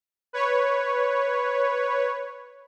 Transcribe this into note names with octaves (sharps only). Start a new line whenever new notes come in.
B4 C#5